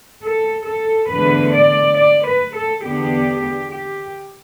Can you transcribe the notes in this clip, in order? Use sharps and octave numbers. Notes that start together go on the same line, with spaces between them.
A4
A4
E2 D3 A3 B4
D5
D5
B4
A4
E2 D3 B3 D4 G4
G4